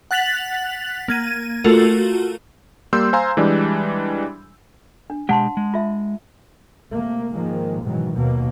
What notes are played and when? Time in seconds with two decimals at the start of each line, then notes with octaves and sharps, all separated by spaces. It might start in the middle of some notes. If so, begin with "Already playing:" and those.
0.11 F#5 F#6 A6 B6 F7 F#7
1.08 A#3 G#6 D#7
1.64 A3 F4 F#4 A4 A#4
2.93 G3 A#3 C6 E6 G6
3.13 C5 F5 G#5 A#5 C6
3.37 E3 G3 G#3 D4
5.10 D4
5.29 B2 G#3 G4 F#5 A5 C6
5.57 G#3
5.74 F4 E5
6.92 C3 A3 A#3
7.34 G#2 D#3 F3 G#3 A#3
7.82 G#2 B2 D#3 E3 F#3
8.14 D#2 B2 F#3 A#3